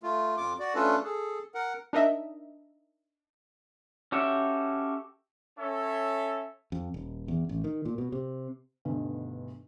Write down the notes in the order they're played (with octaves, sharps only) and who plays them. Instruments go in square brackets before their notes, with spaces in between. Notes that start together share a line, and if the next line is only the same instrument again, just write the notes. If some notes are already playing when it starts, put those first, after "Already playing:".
[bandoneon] A3 F4
F2 F4 D6
F#4 D5
A3 C#4 D4 F4 A4 B4
G#4 A4
A#4 F#5
[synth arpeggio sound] D4 D#4 A#4 D#5 E5
[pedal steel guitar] C#4 F#4 G4 A4 E5
[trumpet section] C#4 A4 C#5 E5
[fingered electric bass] F2
D#1
E2
A1
D#3
A#2
B2
C3
[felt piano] D2 G2 B2 D3 D#3